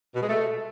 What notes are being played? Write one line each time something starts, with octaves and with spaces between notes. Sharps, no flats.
B2
G#3
A3